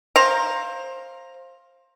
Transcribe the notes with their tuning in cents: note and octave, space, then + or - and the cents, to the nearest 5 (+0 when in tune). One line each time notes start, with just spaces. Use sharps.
C5 +20 F5 +0 A#5 +0